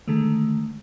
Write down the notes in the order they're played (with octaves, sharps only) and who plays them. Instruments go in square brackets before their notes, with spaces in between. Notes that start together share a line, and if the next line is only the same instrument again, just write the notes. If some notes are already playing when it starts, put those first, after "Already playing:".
[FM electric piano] D3 D#3 G#3 A3